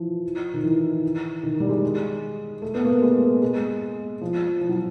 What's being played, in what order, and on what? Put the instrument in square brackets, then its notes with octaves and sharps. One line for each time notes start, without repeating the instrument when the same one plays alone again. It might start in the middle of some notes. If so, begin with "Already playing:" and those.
Already playing: [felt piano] E3 F3
D#3
E3
D#3
G3
G#3
A3
B3
A#3
A3
G#3
G#3
F3
F3
F#3